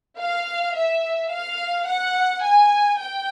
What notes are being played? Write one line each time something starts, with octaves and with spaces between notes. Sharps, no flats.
F5
E5
F5
F#5
G#5
G5